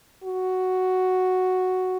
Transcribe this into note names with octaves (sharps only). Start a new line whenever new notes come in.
F#4